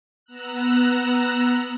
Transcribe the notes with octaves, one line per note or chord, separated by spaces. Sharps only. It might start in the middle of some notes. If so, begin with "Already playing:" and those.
B3 A#5 E6 F#6